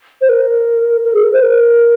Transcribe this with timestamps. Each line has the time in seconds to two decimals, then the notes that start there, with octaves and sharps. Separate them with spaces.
0.21 C5
0.29 A#4
1.04 A#4
1.14 G#4
1.24 A#4
1.33 C5
1.42 A#4